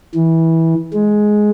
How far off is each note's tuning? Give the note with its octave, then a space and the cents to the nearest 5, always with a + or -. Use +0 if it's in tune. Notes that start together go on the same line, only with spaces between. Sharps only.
E3 -15
G#3 +10